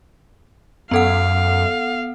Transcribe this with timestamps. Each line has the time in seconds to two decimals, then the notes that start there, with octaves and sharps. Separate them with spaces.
0.91 F#2 B3 A4 F5 F#5